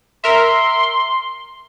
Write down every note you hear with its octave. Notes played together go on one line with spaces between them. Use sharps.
A#4 E5 C6